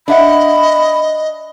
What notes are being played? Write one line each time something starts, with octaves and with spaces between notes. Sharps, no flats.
D4 D#5 E5 F#5 B5